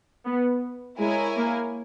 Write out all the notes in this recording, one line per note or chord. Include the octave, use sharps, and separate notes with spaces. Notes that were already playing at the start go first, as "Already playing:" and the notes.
B3
G#3 E4 A#4 C#5 G#5
A#3